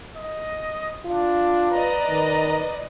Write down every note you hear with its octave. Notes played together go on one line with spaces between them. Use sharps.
D#5
D4 F4
B4 D5 D#5 A#5
D#3